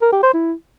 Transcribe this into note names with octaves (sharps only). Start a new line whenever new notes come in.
A#4
G4
C5
E4